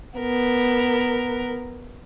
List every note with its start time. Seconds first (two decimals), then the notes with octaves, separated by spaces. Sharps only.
0.19 B3 A#4